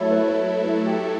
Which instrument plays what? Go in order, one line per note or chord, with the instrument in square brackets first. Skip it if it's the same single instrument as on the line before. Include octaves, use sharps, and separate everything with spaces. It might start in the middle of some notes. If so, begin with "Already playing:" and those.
Already playing: [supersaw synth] F#3 A3 E4 A4 [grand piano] C#5 E5
[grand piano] B4
B4
B4
G4